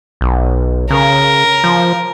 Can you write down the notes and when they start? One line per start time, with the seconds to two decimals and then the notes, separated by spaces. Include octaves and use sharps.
0.21 B1
0.90 C#3 A#4
1.64 F3